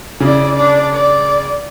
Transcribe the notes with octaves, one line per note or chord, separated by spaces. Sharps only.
C#3 E4 D5
D4 D5
D5